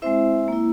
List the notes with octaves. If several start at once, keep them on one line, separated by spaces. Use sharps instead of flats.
G#3 C4 E4 C5 E5
A#3 E4